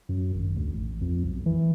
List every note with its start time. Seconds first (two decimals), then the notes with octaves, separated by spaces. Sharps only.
0.09 F#2
0.34 G#1
0.57 D2
0.73 A1
1.01 F2
1.24 B1
1.46 E3